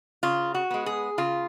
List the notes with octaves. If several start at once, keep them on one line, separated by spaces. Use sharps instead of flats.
C#3 F4
F#4
G#3 B3
G#4
C#3 F4